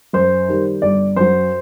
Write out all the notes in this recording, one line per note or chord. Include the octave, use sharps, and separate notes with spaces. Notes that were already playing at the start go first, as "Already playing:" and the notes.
F#2 C5
D#3 G3
G1 D5
F#2 F#3 C5